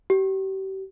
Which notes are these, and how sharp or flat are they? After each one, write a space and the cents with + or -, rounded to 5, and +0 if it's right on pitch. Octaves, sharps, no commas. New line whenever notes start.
G4 -35